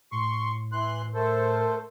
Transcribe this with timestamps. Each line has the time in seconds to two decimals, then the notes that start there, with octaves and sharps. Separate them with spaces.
0.12 A2 C6 C#6
0.72 E3 C6 F#6
1.14 A3 A4 A#4 C5